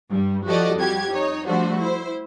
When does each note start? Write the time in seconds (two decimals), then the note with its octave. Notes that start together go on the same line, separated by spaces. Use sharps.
0.10 G2 G3
0.45 F3 F#4 G4 A4 D5 D#5
0.76 F2 G3 F#4 G4 G#6
1.12 D#4 C#5
1.46 F3 G3 A3 D4 F#4 C5
1.81 E4 C5